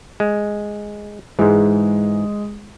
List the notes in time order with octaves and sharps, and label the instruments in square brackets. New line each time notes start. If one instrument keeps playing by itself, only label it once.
[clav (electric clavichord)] G#3
[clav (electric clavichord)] G#2 E3 [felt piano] G#3